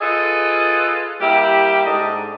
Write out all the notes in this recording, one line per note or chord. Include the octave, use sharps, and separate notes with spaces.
F4 G#4 A4 B4 D#5
G3 A#3 E4 G4
G#2 D4 D#4 A4 D#5